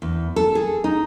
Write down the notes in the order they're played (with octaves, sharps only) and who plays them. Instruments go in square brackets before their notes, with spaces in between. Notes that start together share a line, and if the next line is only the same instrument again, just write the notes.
[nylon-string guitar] E2
A4
G#4
D#4